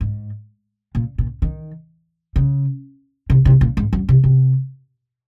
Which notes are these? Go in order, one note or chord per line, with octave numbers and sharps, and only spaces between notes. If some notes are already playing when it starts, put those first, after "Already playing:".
G#2
A#2
A#2
D#3
C#3
C3
C3
A#2
G#2
F#2
C3
C3